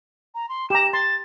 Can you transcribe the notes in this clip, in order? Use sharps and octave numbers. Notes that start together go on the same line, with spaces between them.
A#5
C6
G4 A#5 E7
C6 A6